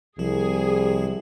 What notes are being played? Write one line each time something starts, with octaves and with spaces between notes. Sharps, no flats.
C2 F3 G#4